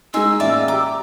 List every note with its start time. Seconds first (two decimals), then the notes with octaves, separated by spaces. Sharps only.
0.14 G#3 D#4 G#5 C6 E6
0.40 A1 A#3 F4 D5 E5
0.68 G4 A#5 D6